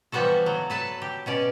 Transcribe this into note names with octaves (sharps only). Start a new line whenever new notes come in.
E3 F3 G3 B3 F#4 A4
F#3
A4 B4 A5
G4
B2 C#4 D5